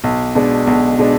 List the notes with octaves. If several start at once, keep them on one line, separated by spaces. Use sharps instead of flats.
B1
B2 G#3 D4
B1
B2 G#3 D4